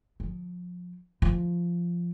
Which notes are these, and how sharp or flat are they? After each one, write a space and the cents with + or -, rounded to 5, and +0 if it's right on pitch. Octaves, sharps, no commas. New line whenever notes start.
F3 +30
F3 -10